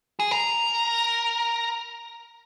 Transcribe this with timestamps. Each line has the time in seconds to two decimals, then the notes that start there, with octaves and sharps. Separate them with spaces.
0.20 G#4
0.31 A#4